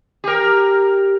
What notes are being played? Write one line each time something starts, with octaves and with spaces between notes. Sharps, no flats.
G4 A#4